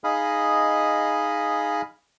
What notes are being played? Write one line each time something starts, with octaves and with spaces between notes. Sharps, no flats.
D#4 G#4 D#5 F5 B5